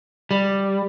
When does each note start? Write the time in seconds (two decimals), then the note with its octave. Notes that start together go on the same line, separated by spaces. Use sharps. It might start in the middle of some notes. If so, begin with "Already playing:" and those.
0.31 G3